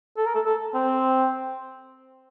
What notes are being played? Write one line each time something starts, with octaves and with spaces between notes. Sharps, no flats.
A4
A#4
A4
A4
C4